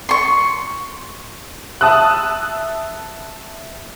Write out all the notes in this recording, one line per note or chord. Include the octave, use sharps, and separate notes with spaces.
C6 C#6
E5 A5 D#6 E6 F#6